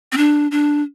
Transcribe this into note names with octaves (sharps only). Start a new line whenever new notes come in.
C4
D4
D4